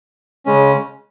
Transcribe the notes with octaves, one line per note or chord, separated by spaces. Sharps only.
C#3 G#3 C#4